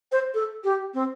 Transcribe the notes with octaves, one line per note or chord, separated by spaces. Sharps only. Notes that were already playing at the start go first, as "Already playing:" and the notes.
C5
A4
G4
C4